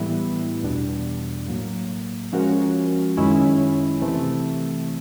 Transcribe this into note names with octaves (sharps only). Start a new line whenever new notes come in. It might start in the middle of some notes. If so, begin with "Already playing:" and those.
Already playing: A2 E3 G3 B3 E4
E2 B2 G3 B3 D4
A2 F#3 A#3
F3 G#3 C#4 F#4 A#4
F#2 D#3 G#3 C#4 E4
C3 E3 A3